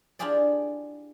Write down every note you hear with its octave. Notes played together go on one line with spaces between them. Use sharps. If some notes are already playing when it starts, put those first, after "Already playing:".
D4 E4 F4 G4 G#4 D5